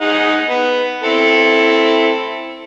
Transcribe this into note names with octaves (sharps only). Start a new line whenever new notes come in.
D#4 G#4 F#5
B3
C4 E4 A4